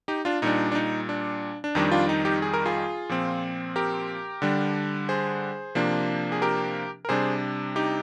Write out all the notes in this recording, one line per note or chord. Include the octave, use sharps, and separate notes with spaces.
D#4 G4
D4 F4
A#2 G3 D4 D#4
D4
D#4
D4
D4
F2 D#3 G3 D4 D#4
D4 F4
D#4
D#4 G4
G#4
A#4
F4 G#4
A#2 F3 C4
G4 A#4
D3 G3 D4
G#4 C5
C3 F3 A#3 D4
G#4
G4 A#4
A#4
C3 G3 D4 G#4 C5
D#4 G4